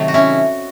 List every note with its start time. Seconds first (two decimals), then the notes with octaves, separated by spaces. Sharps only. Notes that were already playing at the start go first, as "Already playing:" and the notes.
Already playing: C3 D#3 F#3 A3
0.08 F#4
0.14 C#4 E4